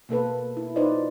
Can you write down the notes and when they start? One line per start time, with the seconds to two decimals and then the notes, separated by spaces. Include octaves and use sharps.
0.09 B2 A#3 A4 B4
0.57 E4
0.76 D#4 F4 B4 C5 D5 D#5